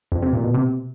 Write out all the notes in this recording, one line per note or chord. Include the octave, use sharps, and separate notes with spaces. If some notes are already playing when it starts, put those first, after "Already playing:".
F2
C3
A#2
B2
C3